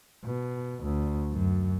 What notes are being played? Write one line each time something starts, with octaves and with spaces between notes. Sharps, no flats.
B2
D2
F#2